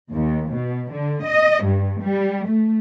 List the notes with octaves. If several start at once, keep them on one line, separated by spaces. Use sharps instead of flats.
D#2
B2
D3
D#5
G2
G3
A3